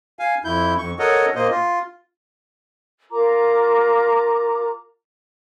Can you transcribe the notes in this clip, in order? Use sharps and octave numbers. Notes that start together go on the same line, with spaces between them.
F5 G#5
F2 E4 G6
F2 C#6
A4 A#4 C#5 D#5 F#5
A#2 A#3 C5 D#5
F4
F4 A#4 A#5 D6